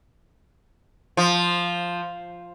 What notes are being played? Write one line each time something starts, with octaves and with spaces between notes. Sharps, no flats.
F3